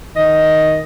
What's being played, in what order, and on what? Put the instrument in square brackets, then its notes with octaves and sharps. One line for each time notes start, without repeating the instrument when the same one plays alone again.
[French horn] D#3 [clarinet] D#5